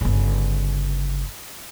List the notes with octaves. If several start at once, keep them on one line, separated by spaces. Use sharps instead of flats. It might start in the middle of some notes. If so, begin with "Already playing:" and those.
G1 C#3